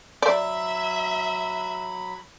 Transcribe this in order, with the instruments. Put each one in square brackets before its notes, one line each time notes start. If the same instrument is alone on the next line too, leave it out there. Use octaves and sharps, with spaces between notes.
[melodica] F#3 B5 [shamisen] D5 [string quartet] E5